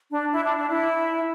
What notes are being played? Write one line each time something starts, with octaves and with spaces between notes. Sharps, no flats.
D4
E4
D4
D4
E4